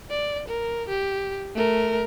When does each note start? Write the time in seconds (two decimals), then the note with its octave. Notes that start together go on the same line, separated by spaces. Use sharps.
0.11 D5
0.48 A#4
0.89 G4
1.55 A3 A#4